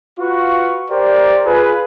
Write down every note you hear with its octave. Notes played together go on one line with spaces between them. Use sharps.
F4 F#4 B4 F5 C#6
G4 A#4 C5 D5
F4 G#4 B4